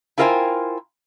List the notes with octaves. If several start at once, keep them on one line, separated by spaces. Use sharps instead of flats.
E4 F4 A#4 C5 G5 G#5